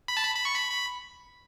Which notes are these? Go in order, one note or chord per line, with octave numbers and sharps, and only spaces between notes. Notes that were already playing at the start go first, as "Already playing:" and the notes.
B5
A5
B5
B5
C#6
B5
B5